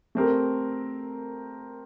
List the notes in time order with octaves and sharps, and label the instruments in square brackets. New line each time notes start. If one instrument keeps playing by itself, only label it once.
[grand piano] A3 C4 G4 A#4